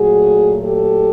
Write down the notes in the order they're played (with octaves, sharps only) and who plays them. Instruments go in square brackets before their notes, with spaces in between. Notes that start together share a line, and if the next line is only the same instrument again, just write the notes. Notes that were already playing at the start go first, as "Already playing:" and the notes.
Already playing: [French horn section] A#2 F#3 A3 F#4 G#4
G4 A4